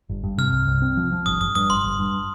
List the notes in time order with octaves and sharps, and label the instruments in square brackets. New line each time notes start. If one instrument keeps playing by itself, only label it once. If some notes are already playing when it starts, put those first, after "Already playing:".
[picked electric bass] G1
G2
[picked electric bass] C3 [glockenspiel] F6
[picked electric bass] C2
C2
C4
F3
F3
[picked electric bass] G1 [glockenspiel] D#6
[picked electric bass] G1 [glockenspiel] D#6
[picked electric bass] G2 [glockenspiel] D#6
[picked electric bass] G1 [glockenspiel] C6
[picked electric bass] G1
G2